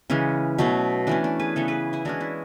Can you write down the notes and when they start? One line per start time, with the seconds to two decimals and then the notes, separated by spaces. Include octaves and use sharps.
0.10 C#3 E3 G#3 C#4
0.58 B2 F#3 A3 C#4
1.07 E3 A3 C#4 D4
1.24 D4
1.40 G#4 B4
1.56 C#3 E3 B3 A4 C#5
1.68 G#4 B4
1.93 E4 G#4
2.05 E3 G#3 C#4 D4 F#4
2.21 E4